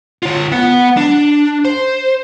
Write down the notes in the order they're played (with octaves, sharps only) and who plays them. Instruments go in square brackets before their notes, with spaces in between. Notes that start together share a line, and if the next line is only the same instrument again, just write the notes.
[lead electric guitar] F4 C#5
B3 F#5
D4
C5